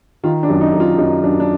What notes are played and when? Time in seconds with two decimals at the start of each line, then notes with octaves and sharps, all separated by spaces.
0.23 D#3 F4
0.43 D4
0.49 F#2
0.61 D#4
0.74 F#2
0.80 F4
0.98 F#2 D#4
1.23 F#2 D4
1.40 D4